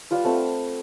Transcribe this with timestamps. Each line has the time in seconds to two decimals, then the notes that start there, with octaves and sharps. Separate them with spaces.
0.11 G3 F4 B4
0.24 A3 C4 F#5 A5